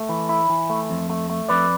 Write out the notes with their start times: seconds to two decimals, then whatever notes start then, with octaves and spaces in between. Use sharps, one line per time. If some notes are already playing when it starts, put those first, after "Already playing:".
Already playing: A3
0.09 E3
0.29 E4
0.49 E3
0.70 A3
0.90 F2
1.10 A3
1.30 A3
1.49 F2 B4 D5